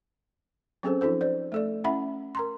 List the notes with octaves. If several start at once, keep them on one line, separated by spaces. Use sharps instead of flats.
F#3 C4 C#4 G#4 A4 C5
F3 D#4 F4 A4 C5
C5 D5
A3 A4 D5
C#4 E4 E5 F#5 B5
A#4 A#5 C6